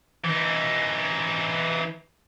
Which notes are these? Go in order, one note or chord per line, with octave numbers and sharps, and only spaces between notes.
E3 D#4